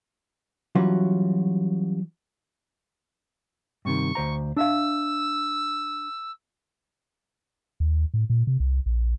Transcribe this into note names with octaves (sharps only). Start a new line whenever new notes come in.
E3 F#3 G3 C#4 F4 F#4
G2 C3 D#3 C#6
D2 C5 A#5
D4 E5 F5 E6
D#2
A2
A#2
C3
C2
A#1